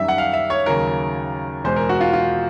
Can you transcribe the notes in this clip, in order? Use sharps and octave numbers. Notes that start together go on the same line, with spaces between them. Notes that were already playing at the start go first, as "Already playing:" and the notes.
Already playing: F#2 D#3 G3 E5
F#5
F5
E5
C#5
D#2 C#3 F#3 A#4
E2 B2 G#3 C5
A#4
F#4
F4
F4